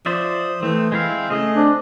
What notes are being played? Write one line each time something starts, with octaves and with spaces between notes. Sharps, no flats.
F3 C5 D5 E5 D#6
E3 A3 C4
G#3 C4 E4 F5
C#3 A3 G#4 D#5
C4 D4